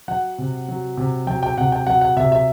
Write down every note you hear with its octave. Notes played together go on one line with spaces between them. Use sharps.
F#3 F#5
C3
F#3
C3
F#3 G5
G5
C3 F#5
G5
F#3 F#5
F#5
C3 E5
E5